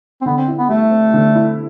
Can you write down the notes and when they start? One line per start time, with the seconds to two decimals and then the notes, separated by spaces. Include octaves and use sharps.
0.21 C4
0.26 D3 B3
0.37 C4
0.48 E4
0.58 B3
0.69 G3 A3
0.91 C4
1.14 D3
1.35 E4